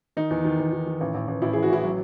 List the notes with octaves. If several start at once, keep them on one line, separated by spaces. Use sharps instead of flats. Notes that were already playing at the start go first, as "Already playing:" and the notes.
D#3 D#4
E2
D#3
E2
D#3
D#3
A1
A1
A1
A1 E4
G#4
E3
F#4
A1 E4
F#3